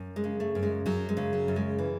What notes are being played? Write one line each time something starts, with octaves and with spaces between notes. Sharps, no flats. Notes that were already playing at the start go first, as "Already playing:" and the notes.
Already playing: F#2
G#3
C#3
A3
F#2
G#3
F#2 F#3
G#3
C#3
F#3
F#2
G#3
E3